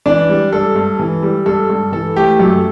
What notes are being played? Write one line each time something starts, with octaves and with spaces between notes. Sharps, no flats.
E3 D4 D5
G3
G2 A4
G2
E3
G3
G2 A4
G2
E3 A4
A3 G4
F#2 A4